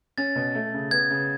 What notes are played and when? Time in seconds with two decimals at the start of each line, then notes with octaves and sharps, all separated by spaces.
0.18 C#4 A6
0.35 B2
0.55 A3
0.74 C#3
0.91 B3 G#6
1.11 C#3